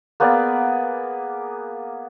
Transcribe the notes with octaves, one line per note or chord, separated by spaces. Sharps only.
A#3 B3 G#4 D5